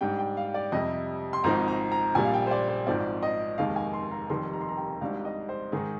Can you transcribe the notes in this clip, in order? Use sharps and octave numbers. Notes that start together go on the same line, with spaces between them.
G#2 G3 D4 G5
G5
F5
D5
F2 C3 G3 D#5
C6
G#1 G#2 F3 C4 D#4 A#5
A#5
A#5
A#1 A#2 G3 G#5
F5
G5
C5
D5
C5
G#1 G#2 F3 C4 D5
D#5
F1 D#2 D#3 G#3 F5
G#5
C6
A#5
F1 F2 D#3 G3 C6
A#5
C6
A#5
G5
G#1 G#2 G3 D4 F5
D#5
C5
G#2 D#3 G#3 D#4 G#4